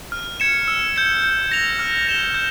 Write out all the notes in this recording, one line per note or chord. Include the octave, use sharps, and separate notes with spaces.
F6
G#6 C#7 E7
E6
G6 C#7
G6
A#6 F7
F6
A#6 E7 G7
G6